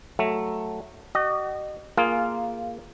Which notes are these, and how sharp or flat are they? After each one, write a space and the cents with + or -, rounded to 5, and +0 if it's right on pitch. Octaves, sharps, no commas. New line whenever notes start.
F#3 +0 A3 +0
F#4 +40 D#5 -30
A#3 +0 F4 -5 G#4 +0